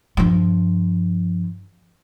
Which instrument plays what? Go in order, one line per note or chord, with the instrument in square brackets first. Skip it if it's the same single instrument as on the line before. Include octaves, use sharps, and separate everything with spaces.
[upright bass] G2 F3